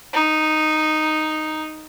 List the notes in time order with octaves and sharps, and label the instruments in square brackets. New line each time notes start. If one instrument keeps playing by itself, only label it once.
[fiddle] D#4